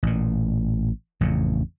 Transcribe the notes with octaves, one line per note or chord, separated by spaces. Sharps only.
A1 A#2
A1 F2 C#3